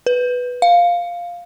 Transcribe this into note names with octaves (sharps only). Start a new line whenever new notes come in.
B4
F5